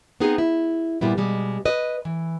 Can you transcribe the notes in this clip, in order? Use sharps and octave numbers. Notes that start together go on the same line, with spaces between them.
B3 C4 D#4 G#4
E4
A#2 G3 B3 E4
B2 G3 G#3
B4 D#5
E3